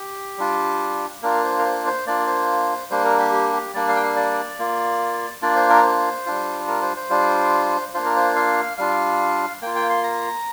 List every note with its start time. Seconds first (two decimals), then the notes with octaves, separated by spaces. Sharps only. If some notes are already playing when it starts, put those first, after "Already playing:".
Already playing: G4
0.38 G3 D4 F4
1.22 A#3 D4 F4 A#4
1.44 C5
1.59 A#4
1.65 C5
1.86 C5
2.07 A#3 D4 F4 D5
2.27 C5
2.90 G3 A#3 D4 C5
3.05 A#4
3.19 G4
3.32 G4
3.53 G4
3.74 G3 A#3 D4 D5
3.88 F5
3.96 G5
4.03 F5
4.16 D5
4.59 A#3 F4
5.42 A#3 D4 F4 D5
5.56 C5
5.69 A#4
5.82 C5
6.26 G3 D4 F4
6.68 A#4
6.82 C5
6.96 C5
7.10 G3 D4 F4
7.94 A#3 D4 F4 C5
8.05 A#4
8.16 C5
8.36 F5
8.78 G3 D4 F4 F5
9.62 A#3 F4 G5
9.76 G5
9.90 C6
10.04 A#5